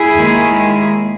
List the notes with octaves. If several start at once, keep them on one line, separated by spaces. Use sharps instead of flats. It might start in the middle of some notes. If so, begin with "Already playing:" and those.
Already playing: E4 G#4
D#2 D#3 G#3